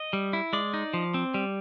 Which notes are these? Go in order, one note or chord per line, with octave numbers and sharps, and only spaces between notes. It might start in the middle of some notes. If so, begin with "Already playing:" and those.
Already playing: D#5
G3
E4
G#3 D5
D#4
F3
C4
G3